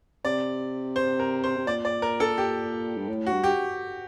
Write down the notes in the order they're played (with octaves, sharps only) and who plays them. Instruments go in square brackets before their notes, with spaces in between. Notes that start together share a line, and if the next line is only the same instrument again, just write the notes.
[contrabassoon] C3 [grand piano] D5
[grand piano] C5
A#4
C5
[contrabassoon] C3
[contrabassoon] A#2 [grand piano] D5
[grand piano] D5
A#4
A4
G4
[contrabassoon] G2
A2
[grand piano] F#4
[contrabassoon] G2
[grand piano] G4